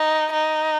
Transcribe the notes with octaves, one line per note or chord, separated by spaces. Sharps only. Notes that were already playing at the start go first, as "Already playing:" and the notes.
Already playing: D#4
D#4